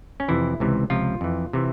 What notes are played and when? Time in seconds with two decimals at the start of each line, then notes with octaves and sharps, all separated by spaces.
0.20 C#4
0.28 F2 C3 E3 E4
0.60 C#2 C3 E3
0.90 C#2 C3 F3 F4
1.21 F2 E3
1.53 C3 E3